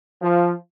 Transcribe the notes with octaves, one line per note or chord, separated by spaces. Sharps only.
F3